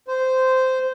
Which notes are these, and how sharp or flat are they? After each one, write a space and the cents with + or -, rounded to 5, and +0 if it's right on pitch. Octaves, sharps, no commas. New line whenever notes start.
C5 -10